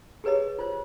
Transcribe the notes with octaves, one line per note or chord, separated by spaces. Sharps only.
G4 G#4 B4 C#5 D#5
F4 C5